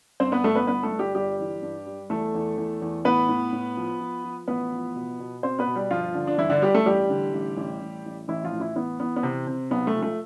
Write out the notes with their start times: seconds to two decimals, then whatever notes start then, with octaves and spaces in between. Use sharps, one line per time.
0.20 G2 C4 C5
0.32 B3 B4
0.43 G1 A3 A4
0.55 B3 B4
0.67 G1 B3 B4
0.83 A3 A4
0.92 G1
0.99 G3 G4
1.15 G1 G3 G4
1.40 E3
1.62 G2
1.86 G3
2.10 E2 A3 A4
2.35 E2
2.57 E2
2.82 E2
3.05 A2 B3 B4
3.29 A2
3.52 A2
3.77 F3
4.01 F3
4.25 F3
4.48 A1 B3 B4
4.72 F3
4.96 B2
5.20 B2
5.43 B2 C4 C5
5.59 B3 B4
5.67 B2
5.76 G3 G4
5.91 G1 F3 F4
6.14 D3
6.27 D4
6.38 G1 E3 E4
6.50 D3 D4
6.62 G2 G3 G4
6.74 A3 A4
6.86 A1 G3 G4
7.10 D3
7.33 A1
7.57 A1
7.82 A1
8.05 A1
8.28 A1 E3 E4
8.44 F3 F4
8.53 A2
8.60 E3 E4
8.76 E3 B3
9.00 E3 B3
9.16 B3
9.23 C3 C4
9.47 C3
9.71 B1 B3
9.87 A3
9.95 F3
10.02 A3